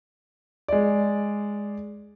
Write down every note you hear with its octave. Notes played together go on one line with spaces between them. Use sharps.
G#3 D5